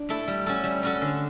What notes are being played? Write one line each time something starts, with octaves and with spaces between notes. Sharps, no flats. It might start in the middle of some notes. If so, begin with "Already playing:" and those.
Already playing: D4
A3 E4 A4
G3
C#4 F#4 A4
G3
C#4 F#4 A4
D3